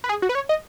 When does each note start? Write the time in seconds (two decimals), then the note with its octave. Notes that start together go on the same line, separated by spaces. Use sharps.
0.04 B4
0.09 G#4
0.22 F#4
0.29 B4
0.35 C#5
0.49 D#5